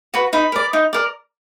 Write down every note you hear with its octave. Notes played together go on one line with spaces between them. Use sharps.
F#4 B4
D#4 B5
A#4 D5
D#4
A#4 D5